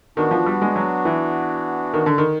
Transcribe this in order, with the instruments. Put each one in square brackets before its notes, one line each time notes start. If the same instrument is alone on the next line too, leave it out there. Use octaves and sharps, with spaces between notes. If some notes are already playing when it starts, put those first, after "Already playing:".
[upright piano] D#3 [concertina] B3 D4 F#4
[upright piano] F3
G3
G#3
F#3
E3
D#3
D3
D#3